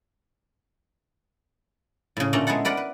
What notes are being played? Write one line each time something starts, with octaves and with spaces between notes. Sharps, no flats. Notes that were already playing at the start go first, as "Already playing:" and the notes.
A2 C#3
A#2 D3 A3 C#4 A5 A#5
G#3 B3 E4 A4 F#5
A#4 B4 D5 F#5
B4